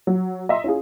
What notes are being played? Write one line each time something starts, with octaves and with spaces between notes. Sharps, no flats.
F#3
D#5 E5 A#5 C6
C#4 E4 F4 G#4